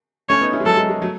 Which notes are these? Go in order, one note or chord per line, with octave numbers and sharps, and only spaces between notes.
A3 C#4 C#5
B3 D#4
C#4 E4
G#3
F#3 A4
G#3
G#3
F#3 A3